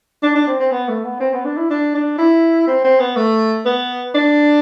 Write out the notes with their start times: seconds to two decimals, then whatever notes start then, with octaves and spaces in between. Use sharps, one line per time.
0.23 D4
0.35 D4
0.47 C4
0.59 C4
0.71 B3
0.88 A3
1.04 B3
1.20 C4
1.33 B3
1.45 D4
1.57 E4
1.70 D4
1.95 D4
2.18 E4
2.67 C4
2.84 C4
3.00 B3
3.16 A3
3.65 B3
4.15 D4